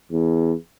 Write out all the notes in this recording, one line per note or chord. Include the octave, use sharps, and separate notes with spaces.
E2